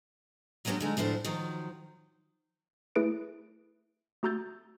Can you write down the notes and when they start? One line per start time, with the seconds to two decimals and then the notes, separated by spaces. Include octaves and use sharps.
0.65 F#3 G#3 B3 C#4 D4 G4
0.80 D3 G#3 D#4
0.97 D2 A2 F3 D4 C5
1.24 D#3 F3 F#3
2.96 A3 E4 G#4 B4 D7
4.23 A3 F#4 A#5 E6 G6 A6